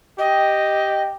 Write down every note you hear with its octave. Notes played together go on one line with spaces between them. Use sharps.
G4 D#5 G5